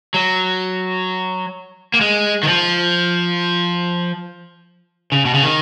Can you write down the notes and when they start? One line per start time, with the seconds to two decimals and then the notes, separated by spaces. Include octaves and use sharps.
0.14 F#3
1.94 A#3
2.01 G#3
2.43 D#3
2.48 F3
5.12 C#3
5.25 B2
5.34 C#3
5.43 D#3